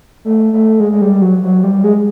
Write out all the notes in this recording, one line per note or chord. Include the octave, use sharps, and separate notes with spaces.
A3
A3
G#3
G#3
G3
F#3
F#3
G3
G#3